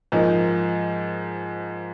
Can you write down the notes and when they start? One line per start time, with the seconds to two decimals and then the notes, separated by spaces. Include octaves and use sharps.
0.12 G#2 F3 A#3 D#4